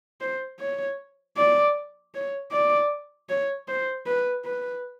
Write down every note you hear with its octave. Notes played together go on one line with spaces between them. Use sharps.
C5
C#5
D5
C#5
D5
C#5
C5
B4
B4